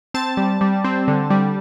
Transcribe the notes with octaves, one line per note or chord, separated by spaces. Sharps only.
C4 A5
G3
G3
C4
D3
G3